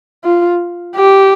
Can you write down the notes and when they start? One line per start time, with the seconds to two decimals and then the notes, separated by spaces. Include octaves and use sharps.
0.24 F4
0.96 G4